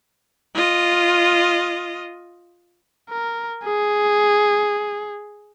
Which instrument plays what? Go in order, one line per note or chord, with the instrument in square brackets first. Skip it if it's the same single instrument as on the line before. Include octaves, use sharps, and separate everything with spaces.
[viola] F4 D#5
[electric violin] A#4
G#4